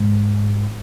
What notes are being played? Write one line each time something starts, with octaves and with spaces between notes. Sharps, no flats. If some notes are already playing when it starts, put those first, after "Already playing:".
Already playing: G#2